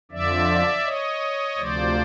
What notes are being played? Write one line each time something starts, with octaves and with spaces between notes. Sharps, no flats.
F2 D3 F3 D5 E5
C#5 D#5
D2 C3 F3 C5 D5